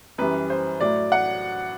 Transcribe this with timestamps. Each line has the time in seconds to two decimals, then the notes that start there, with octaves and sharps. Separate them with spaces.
0.18 F#2 E3 G3 B4
0.50 C5
0.80 A2 F#3 D5
1.12 F#5